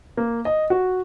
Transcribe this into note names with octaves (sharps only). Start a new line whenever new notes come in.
A#3
D#5
F#4